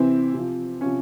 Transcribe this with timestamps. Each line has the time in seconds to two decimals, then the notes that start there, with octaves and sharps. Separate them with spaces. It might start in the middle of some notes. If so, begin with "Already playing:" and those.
Already playing: C3 E3 C4 E4
0.33 C3 F3
0.81 C3 F3 C#4